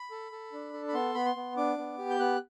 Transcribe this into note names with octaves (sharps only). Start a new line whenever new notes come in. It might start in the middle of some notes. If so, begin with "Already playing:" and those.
Already playing: B5
A4
A4
D4
A4
B5
B3 C6
B3 B5
C6
B3
D4 D6
B3
G4
G6
B3 F#6